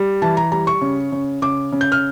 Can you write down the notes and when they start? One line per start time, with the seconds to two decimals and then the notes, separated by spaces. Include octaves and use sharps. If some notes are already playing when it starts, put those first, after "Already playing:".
Already playing: G3
0.22 E3 A5
0.37 A#5
0.52 G3 A#5
0.67 C#6
0.81 C#3
1.12 C#3
1.42 C#3 D6
1.72 C#3
1.81 G6
1.92 F6